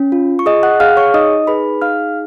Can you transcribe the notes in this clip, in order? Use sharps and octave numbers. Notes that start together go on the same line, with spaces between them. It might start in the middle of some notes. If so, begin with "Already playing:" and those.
Already playing: C#4
F4
C#6
G#4 D#5 D#6
F#5 F#6
G#4 F5 F6
C#5 C#6
D#4 D#5 D#6
G#4 B4 B5
D#4 F5 F6